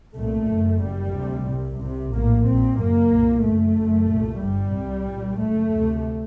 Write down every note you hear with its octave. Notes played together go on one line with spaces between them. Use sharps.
C2 A#2 A3
F#1 F#2
F#1 F#2 G3
D2 C3
C2 C3
C2 C3
A#1 A2 A#3
A#1 A#2 C4
F#1 F#2 A#3
C2 A#2
F#1 F#2 A3
F#1 F#2
C2 A#2
G1 G2 G3
C2 C3
C2 A#2
F#1 F#2 A3
D2 C3